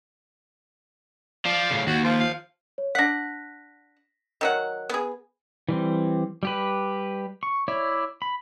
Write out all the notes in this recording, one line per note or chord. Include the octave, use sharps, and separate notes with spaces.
F3 D5 F5
A2 C#3
D#2 F#4 F#5
F3 F4
F5
C#5
D4 F#5 A#6 B6
D#3 F#3 F#5
B3 G#4
E3 G3 C4
G3 G4 B4
C#6
E4 C#5 D5 E5
B5